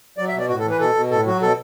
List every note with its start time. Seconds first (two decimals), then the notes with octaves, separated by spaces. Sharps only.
0.18 F#3 D5
0.29 E5
0.33 B2
0.39 D5
0.49 A2 F#4
0.59 A4
0.64 E3
0.70 B4
0.79 B2 A4
0.95 B2
1.10 A2 A4
1.26 F#3 F#4
1.41 B2 A4